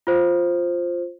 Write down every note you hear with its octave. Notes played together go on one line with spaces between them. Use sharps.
F4 C5